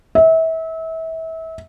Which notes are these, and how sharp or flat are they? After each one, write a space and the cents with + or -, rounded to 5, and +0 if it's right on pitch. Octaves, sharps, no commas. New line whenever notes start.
E5 -30